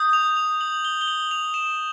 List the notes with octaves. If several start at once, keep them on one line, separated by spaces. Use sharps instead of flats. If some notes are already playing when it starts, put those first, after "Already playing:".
Already playing: D#6 G6
F7
F7
F#7
G7
G7
F#7
F7
E7